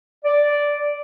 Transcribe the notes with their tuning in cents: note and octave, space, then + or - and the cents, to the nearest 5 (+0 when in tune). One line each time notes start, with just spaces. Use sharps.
D5 -5